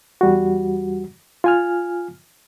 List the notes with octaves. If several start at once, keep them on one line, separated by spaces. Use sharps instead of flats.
E2 G3 F#4
F4 G#5 F6